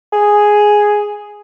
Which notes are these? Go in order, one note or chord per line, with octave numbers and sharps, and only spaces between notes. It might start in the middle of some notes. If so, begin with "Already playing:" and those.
G#4